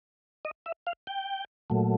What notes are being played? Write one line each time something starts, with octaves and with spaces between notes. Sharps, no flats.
D#5
E5
F5
G5
A#2 F#3 A3